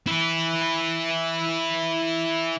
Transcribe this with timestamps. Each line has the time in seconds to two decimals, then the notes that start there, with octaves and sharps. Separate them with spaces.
0.07 E4 B4